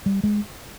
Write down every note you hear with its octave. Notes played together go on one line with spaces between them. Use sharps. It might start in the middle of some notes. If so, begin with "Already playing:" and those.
G3
G#3